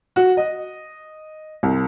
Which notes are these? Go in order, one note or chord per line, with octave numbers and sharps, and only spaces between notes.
F#4
D#5
C2